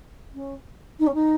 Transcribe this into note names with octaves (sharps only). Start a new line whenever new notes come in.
C#4
D#4
C#4
D#4